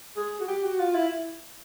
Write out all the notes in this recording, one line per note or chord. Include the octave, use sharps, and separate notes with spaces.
G#4
F#4
G4
F#4
F4
E4